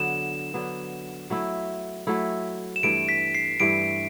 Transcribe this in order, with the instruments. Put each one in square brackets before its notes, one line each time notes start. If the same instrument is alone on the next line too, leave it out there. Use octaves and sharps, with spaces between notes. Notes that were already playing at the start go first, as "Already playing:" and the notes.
Already playing: [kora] D3 F#3 B3 [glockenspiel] E7
[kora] D3 F#3 B3
F#3 A3 E4
F#3 A3 E4
[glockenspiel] E7
[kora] G2 E3 A3 [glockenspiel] D7
[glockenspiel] B6
C7
[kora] G2 E3 A3 [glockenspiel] D7